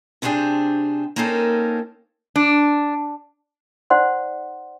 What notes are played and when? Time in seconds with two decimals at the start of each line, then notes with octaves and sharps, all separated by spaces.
0.22 C3 B3 C4 D4 G4 G#4
1.16 A#3 C4 C#4 D#4 A4 A#4
2.36 D4
3.90 D#4 C5 D5 F#5 C6